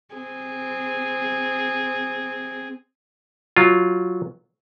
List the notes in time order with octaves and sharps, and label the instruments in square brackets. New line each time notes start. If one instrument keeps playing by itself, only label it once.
[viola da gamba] C4 G#4
[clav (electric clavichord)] F#3 F4